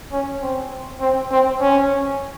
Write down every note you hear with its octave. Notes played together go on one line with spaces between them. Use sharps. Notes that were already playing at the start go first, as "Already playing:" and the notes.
C#4
C4
C4
C4
C#4